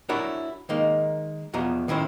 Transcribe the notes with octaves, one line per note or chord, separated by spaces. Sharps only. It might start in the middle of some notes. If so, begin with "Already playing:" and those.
D4 E4 F#4 A#4 C#5
D#3 G#3 A#3 D#4
E2 B2 F3 A#5
A2 D#3 C#4 E4 C5